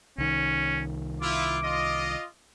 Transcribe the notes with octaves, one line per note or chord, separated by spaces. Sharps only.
C2 D#3 C#4
E4 F4 D6
F4 D#5